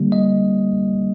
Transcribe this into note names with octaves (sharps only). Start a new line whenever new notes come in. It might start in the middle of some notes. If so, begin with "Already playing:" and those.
Already playing: D3 G3 A#3
D#5